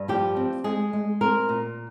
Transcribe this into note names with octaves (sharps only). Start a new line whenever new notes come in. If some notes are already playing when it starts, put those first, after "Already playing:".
Already playing: G2
F3 G4
C4
G#3 G#4
G#3
C4 A#4
A#2